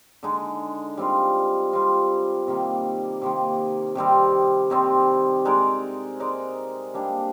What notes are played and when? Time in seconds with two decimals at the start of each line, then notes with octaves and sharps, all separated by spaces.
0.23 D3 G#3 D#4
0.97 G3 C4 F4
1.73 G3 C4 F4
2.47 C3 D#3 A#3
3.22 C3 D#3 A#3
3.95 C3 D#3 G3 C4
4.70 C3 D#3 G3 C4
5.45 G#3 D#4 A#4 D5
6.20 G#3 D#4 A#4 D5
6.94 G3 A#3 D4